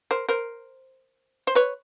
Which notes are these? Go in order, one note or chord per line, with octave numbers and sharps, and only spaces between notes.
A#4 C5
A#4 C5
C5
B4 C#5